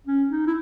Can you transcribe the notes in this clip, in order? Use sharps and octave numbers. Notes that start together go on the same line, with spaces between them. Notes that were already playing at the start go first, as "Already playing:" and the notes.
C#4
D#4
E4